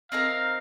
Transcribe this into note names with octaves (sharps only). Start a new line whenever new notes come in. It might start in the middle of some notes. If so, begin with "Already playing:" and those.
C4 D#4 A#4 F5